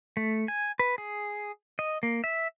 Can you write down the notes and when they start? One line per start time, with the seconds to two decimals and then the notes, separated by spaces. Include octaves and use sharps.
0.17 A3
0.48 G#5
0.79 B4
0.98 G#4
1.79 D#5
2.03 A#3
2.24 E5